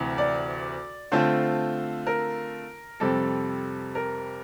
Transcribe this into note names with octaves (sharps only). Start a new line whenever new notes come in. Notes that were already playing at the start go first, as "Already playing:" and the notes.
Already playing: D2 C3 E3
D5
D3 A3 C4 F4 C5
A#4
F2 C3 G3 C4 A4
A#4